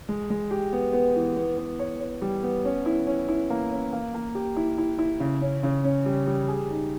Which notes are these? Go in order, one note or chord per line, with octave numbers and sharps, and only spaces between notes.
G#3
G#3
G4
B3
B3
E3
B3
B3
C#5
C#5
G3
B3
C#4
E4
C#4
E4
A#3
C#4
A#3
A#3
G4
E4
E4
E4
C#3
C#4
C#3
C#4
G3
G3
G#4
D#4